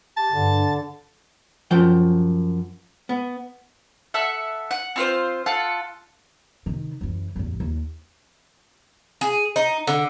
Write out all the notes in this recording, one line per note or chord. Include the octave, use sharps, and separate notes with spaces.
G4 A5
G2 D3
F#2 F3 G5
B3
A4 E5 F#5
F#5
C4 F4 B4 C5
F4 A4 F#5
C3 D#3
F#2 E3
A1 E2
D#2
G#4
D#4
D3